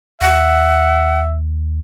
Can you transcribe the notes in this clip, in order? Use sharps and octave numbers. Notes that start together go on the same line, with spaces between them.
D#2 E5 F#5